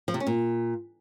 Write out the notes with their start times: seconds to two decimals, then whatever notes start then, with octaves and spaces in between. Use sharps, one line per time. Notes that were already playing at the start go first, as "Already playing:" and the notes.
0.08 F3
0.14 C3
0.20 C#4
0.27 A#2